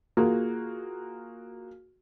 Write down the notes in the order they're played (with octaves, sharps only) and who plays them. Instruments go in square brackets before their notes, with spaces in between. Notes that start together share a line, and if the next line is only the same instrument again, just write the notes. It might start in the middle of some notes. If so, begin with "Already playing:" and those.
[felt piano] A#3 F4 F#4 G#4